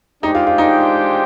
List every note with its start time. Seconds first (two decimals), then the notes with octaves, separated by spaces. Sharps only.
0.23 G#3 D4 D#4 G4 C5 G5
0.35 F4
0.47 F4
0.58 D#4